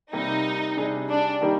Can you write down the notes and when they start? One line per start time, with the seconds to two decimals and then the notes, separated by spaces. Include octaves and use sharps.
0.13 C3 G3 A#3 D#4
0.77 C3 G3 D4 G#4
1.09 D4
1.41 D#3 G3 A#3 D#4 G4